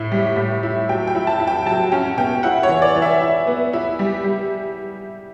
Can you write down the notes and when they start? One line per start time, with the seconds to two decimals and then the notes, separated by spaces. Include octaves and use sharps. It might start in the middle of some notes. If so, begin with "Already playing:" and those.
Already playing: A2 E4
0.12 G3
0.36 A2
0.63 E4
0.89 F#3 G5
1.07 G5
1.15 E4
1.27 A5
1.40 E4
1.47 G5
1.66 F#3 A5
1.92 C#4 G5
2.17 B2 G5
2.43 E4 F#5
2.63 C#5
2.69 E3
2.82 D5
2.95 E3
3.02 E5
3.21 E4
3.47 B3
3.73 E4
3.99 G3
4.24 G3